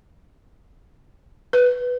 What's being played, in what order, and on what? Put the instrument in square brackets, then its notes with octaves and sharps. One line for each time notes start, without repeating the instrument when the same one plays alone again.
[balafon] B4